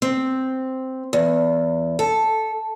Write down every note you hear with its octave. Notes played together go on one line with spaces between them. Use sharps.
C4
E2
A4